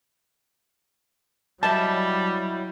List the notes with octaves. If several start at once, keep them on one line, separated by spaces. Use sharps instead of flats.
F#3 G3 E4 D#5 E5 A5